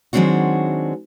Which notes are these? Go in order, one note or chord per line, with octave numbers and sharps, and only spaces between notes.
D#3 F#3 G#3 C4 D4 F#4